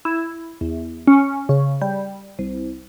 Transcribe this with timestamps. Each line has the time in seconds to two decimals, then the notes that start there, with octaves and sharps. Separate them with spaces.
0.05 E4
0.61 E2
1.07 C#4
1.49 C#3
1.81 G3
2.39 C2